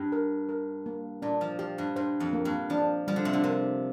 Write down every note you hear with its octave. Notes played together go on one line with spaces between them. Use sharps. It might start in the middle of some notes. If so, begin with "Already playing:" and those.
Already playing: G2 G4
A#4
A#4
A#3
A#2 D4
F3
F3 G4
G2
G2 C5
F2
A#3
G2
F3 D4
F3 G3
D3
C3
D3
C3 A#4